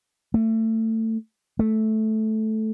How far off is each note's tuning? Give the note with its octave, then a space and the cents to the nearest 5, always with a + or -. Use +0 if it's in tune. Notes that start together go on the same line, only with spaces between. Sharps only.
A3 +25
A3 -10